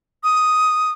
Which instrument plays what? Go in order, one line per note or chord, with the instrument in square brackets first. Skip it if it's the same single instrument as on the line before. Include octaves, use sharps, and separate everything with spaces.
[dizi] D#6